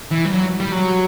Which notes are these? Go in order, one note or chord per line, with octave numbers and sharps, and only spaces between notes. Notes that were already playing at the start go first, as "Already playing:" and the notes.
E3
G3
F#3
G3
F#3